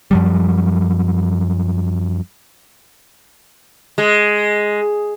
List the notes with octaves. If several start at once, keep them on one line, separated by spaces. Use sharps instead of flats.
F#2 F3 G3
G#3